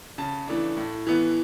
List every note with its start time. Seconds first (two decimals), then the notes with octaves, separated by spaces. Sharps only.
0.18 C#3 A5
0.48 E3 A3 D4
0.77 A2
1.07 E3 B3